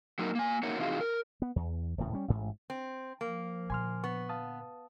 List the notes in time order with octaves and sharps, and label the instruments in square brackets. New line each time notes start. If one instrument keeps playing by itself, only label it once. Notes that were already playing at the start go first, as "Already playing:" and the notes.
[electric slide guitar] F#3 A#3 D#4 F#4 A#4
A#3 G#5
A#3 D#4 F#4 A#4 C#5 F#5
C3 E3 D#4 F4 F#4 G#4
A#4
[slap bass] B3
E2
D#1 A2 C#3
G3 C#4
A1 G#2
[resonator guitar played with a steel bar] C4
[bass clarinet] F3 [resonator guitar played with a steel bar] A#3
[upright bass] A#2 D3 [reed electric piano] G#5 C6 F6
[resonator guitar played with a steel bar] B3 [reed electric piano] C#6
[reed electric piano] F5 A5 D#6